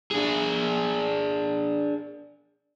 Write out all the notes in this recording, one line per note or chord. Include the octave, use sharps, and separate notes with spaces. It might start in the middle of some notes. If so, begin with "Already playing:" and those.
D4 G#4